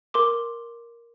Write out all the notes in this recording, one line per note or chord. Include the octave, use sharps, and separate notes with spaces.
A#4 C6 D6